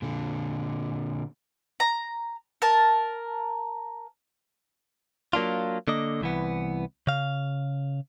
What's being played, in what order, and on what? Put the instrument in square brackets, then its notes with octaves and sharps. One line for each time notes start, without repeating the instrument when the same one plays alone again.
[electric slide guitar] A#2 D3
[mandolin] A#5
A#4 A5
[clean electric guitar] F#3 A#3 D4 F4
D3 A#3 D#5
C2 E3 B3
C#3 F5